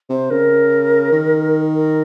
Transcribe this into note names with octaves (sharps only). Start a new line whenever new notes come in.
C3 C5
C#3 A#4
D#3
A#4